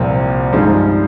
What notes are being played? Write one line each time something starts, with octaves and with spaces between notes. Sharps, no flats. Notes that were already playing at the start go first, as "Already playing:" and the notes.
Already playing: C2 A#2 F3 C4
G2 F3 G#3 D#4